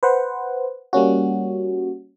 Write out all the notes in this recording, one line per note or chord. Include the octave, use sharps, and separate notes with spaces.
B4 C5 F#5
G3 A#3 C#4 F#4